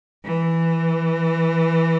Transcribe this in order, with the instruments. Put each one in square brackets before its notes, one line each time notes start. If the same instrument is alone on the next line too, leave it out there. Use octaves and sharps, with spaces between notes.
[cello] E3